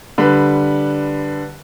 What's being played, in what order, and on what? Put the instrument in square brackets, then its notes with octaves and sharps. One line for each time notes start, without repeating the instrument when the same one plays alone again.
[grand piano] D3 G3 B4